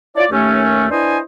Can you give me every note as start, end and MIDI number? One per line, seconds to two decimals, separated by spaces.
0.16 0.25 64
0.16 0.25 65
0.16 0.25 73
0.16 0.25 74
0.31 0.86 39
0.31 0.86 57
0.31 0.86 61
0.91 1.18 62
0.91 1.18 64
0.91 1.18 71
0.91 1.18 72
0.91 1.18 75
0.91 1.18 80